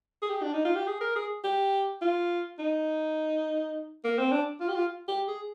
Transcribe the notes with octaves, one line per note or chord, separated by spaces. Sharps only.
G#4
G4
D4
D#4
F4
G4
G#4
A#4
G#4
G4
F4
D#4
A#3
C4
D4
F4
G4
F4
G4
G#4